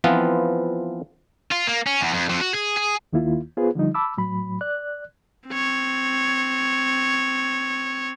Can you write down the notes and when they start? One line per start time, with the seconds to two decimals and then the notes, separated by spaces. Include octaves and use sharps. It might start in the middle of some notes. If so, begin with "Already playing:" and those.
0.04 E3 F3 B3 C4 F4 B4
1.51 F4
1.67 A#3
1.87 C#4
2.01 E2
2.13 F2
2.29 F2
2.41 F#4
2.54 G#4
2.77 G#4
3.13 D#2 D#3 A#3 E4 F4
3.57 B3 F4 G#4 B4 C5
3.75 D3 F3 G3 D#4
3.95 A5 B5 D6 E6
4.17 A2 F#3 B5
4.61 D5 F#6
5.49 C4 C#5